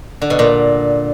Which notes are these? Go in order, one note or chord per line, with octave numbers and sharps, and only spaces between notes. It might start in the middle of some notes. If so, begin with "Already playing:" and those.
D3
B2
A#2